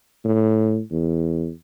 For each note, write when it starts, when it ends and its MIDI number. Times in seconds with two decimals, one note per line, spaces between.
0.25 0.80 45
0.91 1.50 40